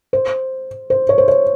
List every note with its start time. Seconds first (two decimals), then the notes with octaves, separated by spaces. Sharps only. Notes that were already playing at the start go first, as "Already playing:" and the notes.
0.13 C5
0.90 C5
1.09 C#5
1.18 C5
1.28 C#5